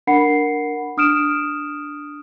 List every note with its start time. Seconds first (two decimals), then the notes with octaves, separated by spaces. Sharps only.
0.07 D4 A#4 F#5 B5 C7 C#7
0.97 D4 D#6 F6 D7 E7